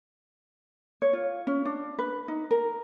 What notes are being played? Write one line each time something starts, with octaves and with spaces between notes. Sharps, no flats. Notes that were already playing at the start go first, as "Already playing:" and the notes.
C#5
F4
C#4
D4
B4
D#4
A#4